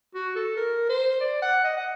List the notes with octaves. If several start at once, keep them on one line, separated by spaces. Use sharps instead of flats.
F#4
A4
A#4
C5
D5
F#5
D#5
F#5